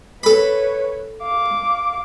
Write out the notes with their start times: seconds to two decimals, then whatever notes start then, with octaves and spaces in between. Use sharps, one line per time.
0.23 A4 B4 C#5 B5
1.23 F5 D6